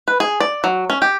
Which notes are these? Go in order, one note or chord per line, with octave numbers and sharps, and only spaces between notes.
B4
G#4
D5
F#3
C#4
G4